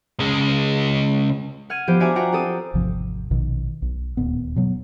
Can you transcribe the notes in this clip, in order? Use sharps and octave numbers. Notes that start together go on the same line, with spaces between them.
C#3 G#3
F#5 F6 G#6 D#7
F3 B3 G4 C5
D4 F#4 E5 G#5 A#5 D6
D4 F4 F#4 F#5 G5 A#5
C4 G4 A4 D#6
G#1 E2 C3 F3
A#1 B2 D#3
B1
D1 D#2 A#2 B3
B2 F#3 B3